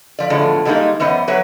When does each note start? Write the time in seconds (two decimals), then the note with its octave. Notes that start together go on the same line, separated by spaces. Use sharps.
0.19 F3 D5
0.30 E2 A2 D3 F3 G#3
0.65 D3 D#3 G3 G#3 A#3 D#4
1.00 F#2 E3 B3 C5 D#5
1.28 F#3 B4 C#5 E5